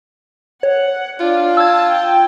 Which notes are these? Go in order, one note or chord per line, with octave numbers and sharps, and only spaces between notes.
C#5 F#5
D4 F4
A5 E6 G#6
G5